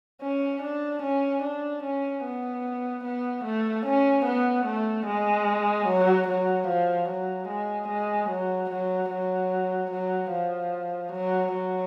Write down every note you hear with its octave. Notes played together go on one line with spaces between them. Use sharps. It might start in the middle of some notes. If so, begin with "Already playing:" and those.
C#4
D4
C#4
D4
C#4
B3
B3
A3
C#4
B3
A3
G#3
F#3
F#3
F3
F#3
G#3
G#3
F#3
F#3
F#3
F#3
F3
F#3
F#3